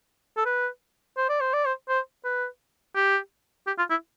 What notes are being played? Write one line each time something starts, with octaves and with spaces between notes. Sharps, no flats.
A4
B4
C5
D5
C5
D5
C5
C5
B4
G4
G4
F4
E4